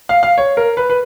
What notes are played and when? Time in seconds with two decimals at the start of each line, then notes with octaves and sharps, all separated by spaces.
0.09 F5
0.23 F5
0.38 C#5
0.57 A#4
0.77 B4
0.90 B4